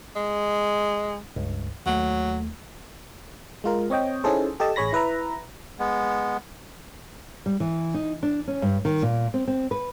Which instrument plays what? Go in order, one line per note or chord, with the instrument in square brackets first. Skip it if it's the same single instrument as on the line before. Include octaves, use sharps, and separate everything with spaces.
[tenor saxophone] G#3
[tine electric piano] C#2 G2
[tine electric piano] D#2 A3 [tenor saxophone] F#3
[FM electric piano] G#3 F4 A#4
C4 C#5 D#5 G5
C#4 D#4 E4 G#4 A4 C5
G4 A4 D#5 A5
A1 G#4 C#5 B5 A#6
E4 B4 E5 A#5
[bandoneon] G#3 B3
[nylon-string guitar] G3
E3
D#4
D4
C#4
G2
D#3
A#2
C4
C4
B4